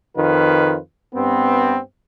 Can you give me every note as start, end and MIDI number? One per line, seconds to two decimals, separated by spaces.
0.16 0.76 41
0.16 0.76 51
0.16 0.76 65
0.16 0.76 71
1.14 1.79 43
1.14 1.79 59
1.14 1.79 60